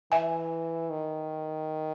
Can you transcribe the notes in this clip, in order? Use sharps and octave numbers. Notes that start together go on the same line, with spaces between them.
E3 E5 G#5
D#3